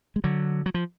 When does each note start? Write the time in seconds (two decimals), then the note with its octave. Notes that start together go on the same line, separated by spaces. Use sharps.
0.16 G#3
0.24 D3 F#3
0.66 F#3
0.74 F3